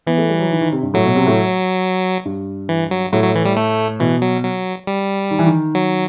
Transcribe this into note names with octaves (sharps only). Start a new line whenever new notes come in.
E3 B3
A3
G3
F#3
D#3
D#3
C3
G2
A2 F#3
B2
C3
A2
G2
E3
F#3
A2 F#3
F#3
E3
G3
A3
B2 E3
F#3
F#3
G3
D#3
E3
D#3
F#3